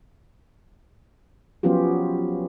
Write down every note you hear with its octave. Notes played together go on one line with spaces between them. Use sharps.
F3 F#3 B3 C#4 F4 G4